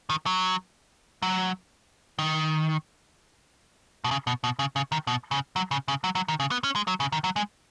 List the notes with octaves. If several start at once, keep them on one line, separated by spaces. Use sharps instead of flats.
D#3
F#3
F#3
D#3
B2
C#3
B2
B2
C#3
C#3
D#3
B2
C#3
F#3
C#3
C#3
F#3
F#3
D#3
C#3
B3
C#4
G#3
F#3
C#3
D#3
F#3
G#3